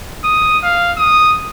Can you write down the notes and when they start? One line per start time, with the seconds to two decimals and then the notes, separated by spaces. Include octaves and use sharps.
0.24 D#6
0.64 F5
0.97 D#6